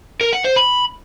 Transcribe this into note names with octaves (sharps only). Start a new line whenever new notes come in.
A#4
F#5
C5
B5